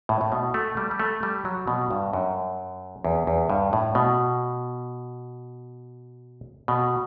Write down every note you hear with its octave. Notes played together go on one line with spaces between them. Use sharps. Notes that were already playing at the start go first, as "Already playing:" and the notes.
A2
A2
B2
A3
G3
G3
A3
G3
F#3
B2
G2
F#2
E2
E2
G2
A2
B2
B2